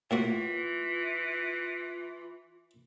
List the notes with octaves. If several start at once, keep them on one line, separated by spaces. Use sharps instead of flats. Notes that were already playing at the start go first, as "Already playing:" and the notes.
A2 E3 A#3 F4 F#4